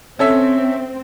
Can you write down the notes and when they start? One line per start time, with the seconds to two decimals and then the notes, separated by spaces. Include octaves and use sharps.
0.19 C4 C#4 A4 E5